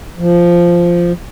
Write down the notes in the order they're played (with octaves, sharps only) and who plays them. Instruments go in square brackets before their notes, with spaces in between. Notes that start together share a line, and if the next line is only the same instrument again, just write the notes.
[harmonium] F3